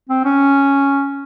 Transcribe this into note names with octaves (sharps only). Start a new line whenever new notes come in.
C4
C#4